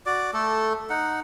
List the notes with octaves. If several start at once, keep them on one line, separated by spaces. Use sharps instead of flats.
F#4 D5 D6
A3 A4
D#4 F#5